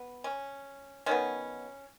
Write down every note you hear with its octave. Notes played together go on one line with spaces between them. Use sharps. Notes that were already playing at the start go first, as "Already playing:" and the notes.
Already playing: B3
C#4
D#3 F#3 B3 C#4